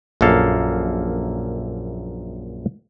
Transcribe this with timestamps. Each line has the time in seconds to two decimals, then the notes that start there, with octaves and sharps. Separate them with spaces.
0.21 A#1 F#2 A#3 A4 F5